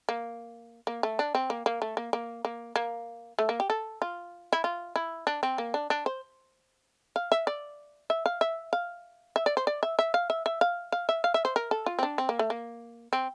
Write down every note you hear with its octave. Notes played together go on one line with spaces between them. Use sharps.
A#3
A#3
A3
D4
C4
A#3
A#3
A3
A#3
A#3
A#3
A#3
A3
A#3
G4
A4
F4
E4
F4
E4
D4
C4
A#3
D4
D4
C5
F5
E5
D5
E5
F5
E5
F5
E5
D5
C5
D5
E5
E5
F5
E5
E5
F5
F5
E5
F5
E5
C5
A#4
A4
F4
C4
D4
C4
A#3
A3
A#3
C4